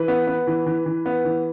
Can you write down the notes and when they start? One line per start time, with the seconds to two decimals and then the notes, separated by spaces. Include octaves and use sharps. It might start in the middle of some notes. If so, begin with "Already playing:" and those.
Already playing: E3 B4
0.08 B3
0.27 B3
0.47 E3
0.66 E3
0.86 E3
1.06 B3
1.25 E3